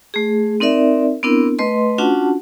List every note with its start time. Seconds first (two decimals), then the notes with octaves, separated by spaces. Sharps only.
0.14 A3 G#4
0.60 C4 D#4 A#4 D5 E5
1.23 B3 C4 D4 E4 A#4
1.59 A3 B4 D#5 C6
1.98 C#4 D4 F4 F#4 F#5 A5